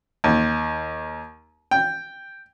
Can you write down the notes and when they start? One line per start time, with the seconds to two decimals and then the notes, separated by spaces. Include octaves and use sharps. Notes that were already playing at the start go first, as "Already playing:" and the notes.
0.24 D#2
1.71 G5